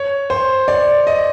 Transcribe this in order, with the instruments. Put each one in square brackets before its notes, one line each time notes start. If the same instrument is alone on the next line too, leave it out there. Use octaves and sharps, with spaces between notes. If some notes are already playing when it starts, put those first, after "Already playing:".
Already playing: [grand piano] C#5
C5
D5
D#5